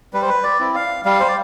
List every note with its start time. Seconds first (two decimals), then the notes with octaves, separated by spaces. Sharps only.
0.14 G3 B4
0.22 C5
0.29 B4
0.44 D5
0.60 C4 E4
0.75 F5
1.05 G3 F5
1.20 C5
1.28 D5